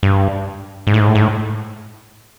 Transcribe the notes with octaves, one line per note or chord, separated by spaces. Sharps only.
G2
G#2
A2
G#2
A2
G#2
A2